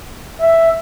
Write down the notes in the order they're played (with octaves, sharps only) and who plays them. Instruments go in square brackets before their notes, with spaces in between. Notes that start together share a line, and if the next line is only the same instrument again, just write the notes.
[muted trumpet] E5